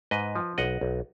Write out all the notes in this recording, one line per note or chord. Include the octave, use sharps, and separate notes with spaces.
G#2 B4 D#5
F3
B1 D#5 F#5
B1